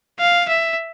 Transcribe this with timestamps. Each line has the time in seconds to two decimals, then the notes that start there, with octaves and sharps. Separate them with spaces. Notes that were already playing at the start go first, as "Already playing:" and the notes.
0.20 F5
0.48 E5